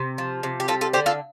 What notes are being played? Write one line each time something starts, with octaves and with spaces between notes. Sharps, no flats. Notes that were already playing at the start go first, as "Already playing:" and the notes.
Already playing: C3
F3
C3
G4
G3 F4 A4
F4 A4
D3 G4 C5
F4 A4